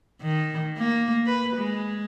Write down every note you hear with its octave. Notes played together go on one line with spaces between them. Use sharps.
D#3
A#3
B4
G#3